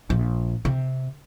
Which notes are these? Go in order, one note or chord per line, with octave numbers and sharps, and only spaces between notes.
A#1
C3